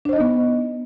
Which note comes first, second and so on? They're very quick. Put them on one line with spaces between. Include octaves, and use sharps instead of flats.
D4 C5 D#5 D#4 B3